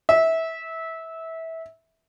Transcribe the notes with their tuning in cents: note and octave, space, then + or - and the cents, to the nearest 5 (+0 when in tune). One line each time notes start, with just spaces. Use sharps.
E5 -20